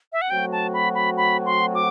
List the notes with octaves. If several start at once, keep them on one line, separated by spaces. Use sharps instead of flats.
E5
F#5
F#3 A3 C4 F#4 G5
A5
B5
B5
B5
C6
D6